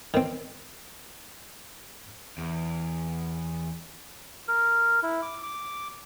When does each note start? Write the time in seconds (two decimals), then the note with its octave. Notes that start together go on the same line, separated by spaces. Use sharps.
0.14 D#3 C4
2.38 E2
4.48 A#4
5.03 E4
5.22 D6
5.43 D6